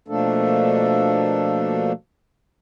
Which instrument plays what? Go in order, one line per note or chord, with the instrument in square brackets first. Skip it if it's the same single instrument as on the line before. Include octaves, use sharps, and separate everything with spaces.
[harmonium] B2 F3 A3 A#3 D4 A4